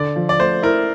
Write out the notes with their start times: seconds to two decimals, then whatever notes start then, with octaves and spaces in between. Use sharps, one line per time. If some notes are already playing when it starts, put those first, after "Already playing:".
Already playing: D3 D5
0.16 F3
0.29 D5
0.39 A3 C5
0.63 E4 A#4